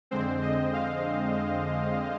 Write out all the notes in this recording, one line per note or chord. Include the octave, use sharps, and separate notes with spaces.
F2 D3 G#3 C4 C5
D#5
F5